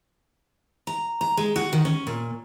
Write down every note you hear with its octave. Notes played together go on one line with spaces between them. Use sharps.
A#5
A#5
G#3
F#4
D#3
C#4
A#2